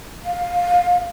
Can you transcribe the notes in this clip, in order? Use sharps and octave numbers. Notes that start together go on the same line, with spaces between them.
F5